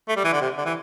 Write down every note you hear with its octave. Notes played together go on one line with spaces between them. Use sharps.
A3
G3
E3
D3
C3
D3
E3